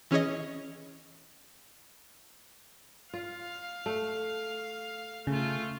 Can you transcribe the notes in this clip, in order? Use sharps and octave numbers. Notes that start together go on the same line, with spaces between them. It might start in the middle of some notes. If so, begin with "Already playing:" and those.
E3 C#4 G#4 C#5 D#5
F4 F5
A3
C#3 A3 F4